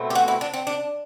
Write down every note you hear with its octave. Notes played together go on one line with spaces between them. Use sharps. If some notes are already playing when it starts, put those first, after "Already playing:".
Already playing: B2 A3 C4
G4
F#4
E4
D4
C4
D4